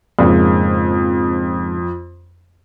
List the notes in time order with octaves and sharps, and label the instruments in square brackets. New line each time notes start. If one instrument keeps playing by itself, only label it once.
[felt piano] F2 [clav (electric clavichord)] G#2 C#3 A#3